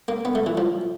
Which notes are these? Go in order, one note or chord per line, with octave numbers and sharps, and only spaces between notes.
A#3
B3
A3
E3
F3